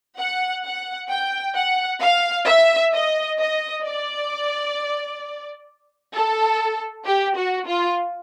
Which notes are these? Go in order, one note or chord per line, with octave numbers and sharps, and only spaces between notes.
F#5
F#5
G5
F#5
F5
E5
D#5
D#5
D5
A4
G4
F#4
F4